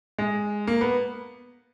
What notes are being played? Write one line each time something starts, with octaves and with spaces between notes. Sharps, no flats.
G#3
A#3
B3